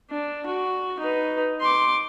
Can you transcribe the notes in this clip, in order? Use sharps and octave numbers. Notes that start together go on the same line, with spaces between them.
D4
F#4
D#4 B4
C6 D6